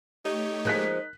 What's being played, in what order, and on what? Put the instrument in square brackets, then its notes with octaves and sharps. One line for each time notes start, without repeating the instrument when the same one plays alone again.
[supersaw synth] A3 G4 C#5 [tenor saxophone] D#4
[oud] F3 G#3 A#3 [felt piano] A#4 F#6 B6